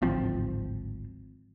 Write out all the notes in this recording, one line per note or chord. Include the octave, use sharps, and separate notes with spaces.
D1 G#1 F3 C4